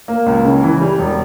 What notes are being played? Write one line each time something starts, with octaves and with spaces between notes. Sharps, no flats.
A#3
C#2
C#3
E3
G3
E1